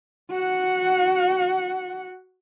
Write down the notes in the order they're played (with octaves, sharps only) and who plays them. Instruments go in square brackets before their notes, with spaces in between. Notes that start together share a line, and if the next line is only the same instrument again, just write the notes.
[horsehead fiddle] F#4 F#5